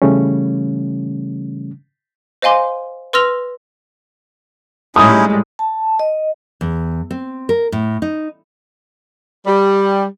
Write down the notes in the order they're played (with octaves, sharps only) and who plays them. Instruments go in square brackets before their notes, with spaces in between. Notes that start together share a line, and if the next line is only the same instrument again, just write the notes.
[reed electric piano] C#3 E3 G3 A3 C#4
[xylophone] C5 D#5 F5 G#5 C6 D6
B4 C6 E6 F6 A#6 F7
[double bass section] A2 G3 G#3 [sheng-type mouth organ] C#4 D#4 E4 [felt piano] D#6
[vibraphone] A5
D#5
[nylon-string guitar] E2
C4
A#4
A2
D#4
[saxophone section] G3